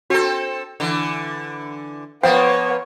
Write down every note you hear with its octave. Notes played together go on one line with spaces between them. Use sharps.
C4 F#4 A4
D3 E3
F3 A#3 B3 C5 C#5 F5 G5